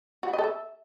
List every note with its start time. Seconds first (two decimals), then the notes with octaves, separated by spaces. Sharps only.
0.23 F#4
0.28 E4
0.33 D#5
0.38 A4
0.44 E5